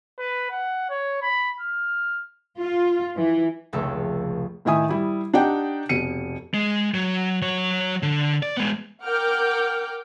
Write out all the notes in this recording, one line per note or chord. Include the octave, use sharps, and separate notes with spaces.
B4
F#5
C#5
B5
F6
F4
E3
F1 C#2 A3 A4
A2 D#3 E4 E5 G#5 D#6
G3 E4
D4 D#4 G4 F#5 G5
F1 B2 C#7 D#7
G#3
F#3
F#3 C#5
D3
D5
G#3 B3
A#4 F#5 G5 D6 F6 G6